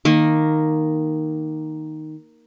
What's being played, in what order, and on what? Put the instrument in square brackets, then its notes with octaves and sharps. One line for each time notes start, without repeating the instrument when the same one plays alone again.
[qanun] D#3 A#3